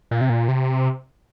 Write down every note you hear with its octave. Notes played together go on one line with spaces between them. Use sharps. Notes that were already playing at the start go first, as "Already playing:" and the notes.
A#2
C3
A#2
C3